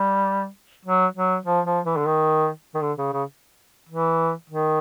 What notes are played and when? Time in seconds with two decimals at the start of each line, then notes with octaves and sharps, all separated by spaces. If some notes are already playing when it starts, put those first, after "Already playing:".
Already playing: G3
0.85 F#3
1.15 F#3
1.46 F3
1.65 F3
1.85 E3
1.97 D3
2.06 D#3
2.75 D#3
2.82 D3
2.98 C#3
3.13 C#3
3.89 E3
4.50 D#3